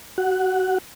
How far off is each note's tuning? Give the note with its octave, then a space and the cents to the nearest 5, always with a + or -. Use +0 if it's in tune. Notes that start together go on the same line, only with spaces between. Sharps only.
F#4 +25 F#5 +0